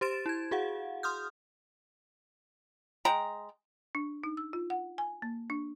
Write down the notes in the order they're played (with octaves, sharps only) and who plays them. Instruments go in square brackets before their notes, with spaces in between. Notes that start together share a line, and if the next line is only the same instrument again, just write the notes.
[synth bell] G4 C5 C6 A6 D7 E7
E4 G#6
F#4 G#4 F5 F#5
C6 D#6 F6 G6
[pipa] G#3 G5 A#5
[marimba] D4
D#4
E6
F4
F#5
G#5
A#3
D4